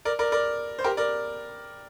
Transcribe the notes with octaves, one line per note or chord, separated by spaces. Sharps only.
A#4 D5
A#4 D5
A#4 D5
C5
G4 A#4
A#4 D5